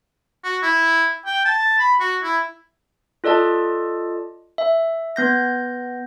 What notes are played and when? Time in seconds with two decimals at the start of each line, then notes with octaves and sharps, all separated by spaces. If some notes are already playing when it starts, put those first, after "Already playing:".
0.43 F#4
0.63 E4
1.26 G5
1.45 A5
1.79 B5
2.00 F#4
2.23 E4
3.24 F4 A4 D5 D#5 A5
4.58 E5
5.16 B3 G6 A#6